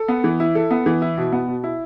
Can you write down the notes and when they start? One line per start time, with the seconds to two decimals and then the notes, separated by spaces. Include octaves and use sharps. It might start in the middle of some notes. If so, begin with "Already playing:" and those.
Already playing: A4
0.08 B3
0.24 E3
0.40 E4
0.55 A4
0.71 B3
0.86 E3
1.02 E4
1.17 B2
1.32 B3
1.48 B2
1.64 E4